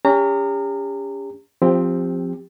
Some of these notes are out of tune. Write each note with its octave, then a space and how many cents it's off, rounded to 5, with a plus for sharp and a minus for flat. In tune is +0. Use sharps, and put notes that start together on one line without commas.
C#4 +30 G4 +40 A#5 -25
F3 +10 C4 +0 G4 +25